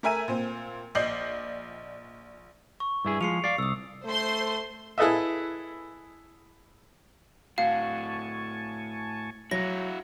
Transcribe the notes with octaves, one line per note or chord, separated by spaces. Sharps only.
A3 A#4 E5 G#5 D#7
A#2 C4
A#1 D5 D#5 G6 C7 F#7
C#6
G2 E4 G#4
F3 G#3 C7 C#7 F7
D5 F5 C7
C2 D#6 E6
A3 C5 C6
E4 G#4 A4 B4 D#5 E5
A2 F#4 F5 G#5 A5 C#6
F#3 E4 F#4 A#6